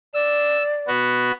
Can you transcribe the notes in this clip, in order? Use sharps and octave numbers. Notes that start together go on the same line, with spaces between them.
D5 E6
B3 F#4